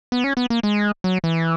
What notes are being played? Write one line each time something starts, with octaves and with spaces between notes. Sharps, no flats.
B3
C#4
B3
A#3
G#3
F#3
E3